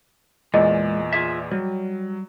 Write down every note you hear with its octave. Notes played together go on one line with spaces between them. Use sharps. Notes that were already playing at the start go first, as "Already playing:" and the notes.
E2 A#2 G#3 D5 D#5
F4 G#4 E5
F#3 G3